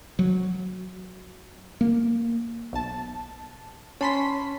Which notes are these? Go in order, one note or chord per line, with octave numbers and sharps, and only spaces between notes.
F#3
A#3
B1 A5
C#4 A5 B5 C6 B6